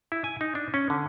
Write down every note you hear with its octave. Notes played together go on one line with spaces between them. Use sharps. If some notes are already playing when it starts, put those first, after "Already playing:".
E4
G#5
D#4
D4
C#4
D3